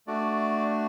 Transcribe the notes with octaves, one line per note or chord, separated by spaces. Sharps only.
A3 D4 F#4 D5